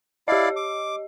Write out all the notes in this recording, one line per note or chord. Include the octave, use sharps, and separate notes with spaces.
E4 G4 D5 D#5 F5
D6